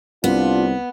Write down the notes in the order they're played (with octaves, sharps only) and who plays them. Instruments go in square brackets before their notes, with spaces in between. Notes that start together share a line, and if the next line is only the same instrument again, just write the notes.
[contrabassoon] C2 [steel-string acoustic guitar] B3 [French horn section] D4 F4